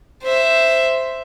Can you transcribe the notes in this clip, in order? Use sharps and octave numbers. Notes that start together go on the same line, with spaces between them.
C5 E5